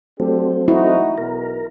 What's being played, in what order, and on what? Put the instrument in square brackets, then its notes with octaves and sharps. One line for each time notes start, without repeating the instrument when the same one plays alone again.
[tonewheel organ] F#3 A3 C4 [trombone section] D4 G4 A4
[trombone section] D#4 F#4 [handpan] E4
[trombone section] B1 B2 [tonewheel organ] A#4